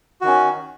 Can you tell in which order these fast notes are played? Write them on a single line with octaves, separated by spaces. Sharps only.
F#4 D#3 C#4